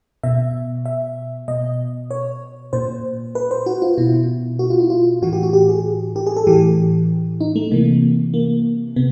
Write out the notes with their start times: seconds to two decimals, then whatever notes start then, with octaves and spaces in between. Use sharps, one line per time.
0.24 B2 E5
0.86 E5
1.48 B2 D#5
2.11 C#5
2.73 A#2 C5
3.35 B4
3.51 C5
3.66 F#4
3.82 F4
3.98 B2 E4
4.59 F#4
4.70 F4
4.80 E4
4.90 F4
5.22 A2 E3 F#4
5.33 G4
5.43 F#4
5.53 G4
5.69 G#4
6.16 G4
6.27 G#4
6.37 A4
6.47 A2 E3 G4
7.41 D#4
7.56 A3
7.71 C3 E3 A#3
8.34 A#3
8.96 C3 B3